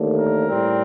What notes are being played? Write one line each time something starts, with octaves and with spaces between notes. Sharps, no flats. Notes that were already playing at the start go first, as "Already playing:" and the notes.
Already playing: D#2 D3 A3
A#4
A2 G3 C4